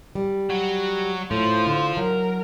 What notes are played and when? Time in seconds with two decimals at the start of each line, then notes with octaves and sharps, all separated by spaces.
0.15 G3
0.50 F#3
1.31 A2 F3 C5
1.67 D3
1.97 F#3 A#4